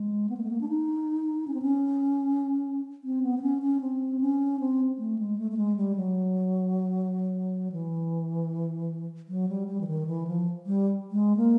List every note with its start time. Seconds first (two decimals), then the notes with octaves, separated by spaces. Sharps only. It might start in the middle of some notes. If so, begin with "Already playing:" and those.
Already playing: G#3
0.30 B3
0.37 A#3
0.43 A3
0.51 A#3
0.61 D4
0.69 D#4
1.48 C#4
1.54 C4
1.62 C#4
3.04 C4
3.23 B3
3.38 C4
3.42 C#4
3.62 C#4
3.81 C4
4.21 C#4
4.60 C4
4.98 A3
5.18 G#3
5.39 A3
5.51 A3
5.57 G#3
5.76 G3
5.96 F#3
7.72 E3
9.29 F#3
9.49 G3
9.68 G3
9.81 E3
9.87 D#3
10.07 E3
10.27 F3
10.66 G3
11.12 G#3
11.37 A#3